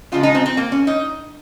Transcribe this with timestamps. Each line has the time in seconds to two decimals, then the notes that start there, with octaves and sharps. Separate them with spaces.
0.12 C#3 F3 G#3 F4
0.23 D#4
0.35 C4
0.46 C4
0.57 A#3
0.72 C#4
0.87 D#4